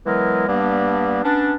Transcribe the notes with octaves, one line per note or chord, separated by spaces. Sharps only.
E3 F#3 G#3 B3 A#4
G2 G3 A#3 B3 D4
B3 C#4 D4